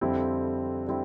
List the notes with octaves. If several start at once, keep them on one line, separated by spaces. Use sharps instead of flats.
F2 D3 G3 C4 E4
D3 G3 C4 E4